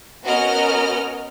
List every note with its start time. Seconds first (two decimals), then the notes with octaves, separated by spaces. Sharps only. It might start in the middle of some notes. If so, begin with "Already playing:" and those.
0.24 B3 C#4 F#4 A#4 D#5 F6